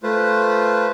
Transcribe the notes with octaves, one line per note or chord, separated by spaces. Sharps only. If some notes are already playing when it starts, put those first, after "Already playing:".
A3 F4 B4 C5